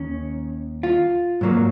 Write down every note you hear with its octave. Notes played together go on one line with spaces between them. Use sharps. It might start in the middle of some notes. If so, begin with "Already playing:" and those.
Already playing: D#2 D#3 C#4
F4
G#2 F#3 A#3